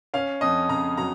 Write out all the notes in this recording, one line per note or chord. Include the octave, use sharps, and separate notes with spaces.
C#4 F5
F2 D#5
C#3 A#5
F#3 A#5